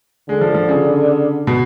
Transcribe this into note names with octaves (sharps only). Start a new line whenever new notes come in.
D3 G#3
F3
F3
C#3
B2